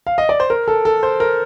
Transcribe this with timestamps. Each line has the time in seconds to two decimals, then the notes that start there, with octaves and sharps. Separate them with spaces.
0.07 F5
0.18 D#5
0.29 D5
0.40 C5
0.50 A#4
0.68 A4
0.85 A4
1.03 C5
1.20 A#4